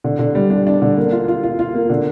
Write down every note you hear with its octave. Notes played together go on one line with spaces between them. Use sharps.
D3
D3
G3
D4
D4
D3
A#3
F4
F4
F4
F4
A#3
D3